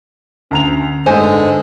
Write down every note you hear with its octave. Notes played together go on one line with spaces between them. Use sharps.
D2 C#4 A#5 F7
G1 G#2 D3 G#3 A3 C5 G#5